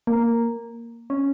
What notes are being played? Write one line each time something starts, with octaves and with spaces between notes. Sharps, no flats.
A#3
C#4